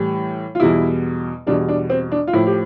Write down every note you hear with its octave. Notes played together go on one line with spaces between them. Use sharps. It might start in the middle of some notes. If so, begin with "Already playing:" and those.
Already playing: A2 E3 G3
F4
E2 B2 G3 E4
E2 B2 G3 D4
D4
C4
D4
F4
A2 F3 E4
G4